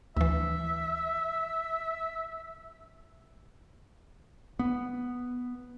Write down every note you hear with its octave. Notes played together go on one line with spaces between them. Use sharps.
D2 E3 E5
B3